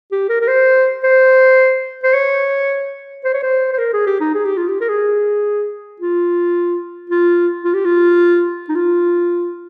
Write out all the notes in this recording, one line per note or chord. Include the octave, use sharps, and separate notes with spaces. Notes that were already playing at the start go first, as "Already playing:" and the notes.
G4
A#4
A#4
C5
C5
C5
C#5
C5
C#5
C5
C5
A#4
G#4
G4
D#4
G#4
G4
F4
G4
A#4
G#4
F4
F4
F4
G4
F4
D#4
F4